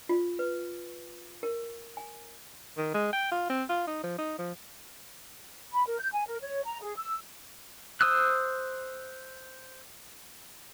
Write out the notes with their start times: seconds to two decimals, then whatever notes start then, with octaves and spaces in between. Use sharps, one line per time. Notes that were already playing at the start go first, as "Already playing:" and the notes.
0.09 F4
0.39 B4
1.43 A#4
1.97 G#5
2.77 D#3
2.94 G#3
3.13 G5
3.31 F4
3.50 C4
3.69 F4
3.87 D#4
4.04 F3
4.18 D#4
4.39 F3
5.73 B5
5.86 A#4
5.99 G6
6.13 G#5
6.27 A#4
6.42 C#5
6.65 A#5
6.82 G#4
6.97 E6
8.01 C5 D#6 E6 F#6